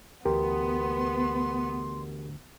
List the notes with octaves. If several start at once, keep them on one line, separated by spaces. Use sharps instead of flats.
D2 E3 B3 G4 A#4 C6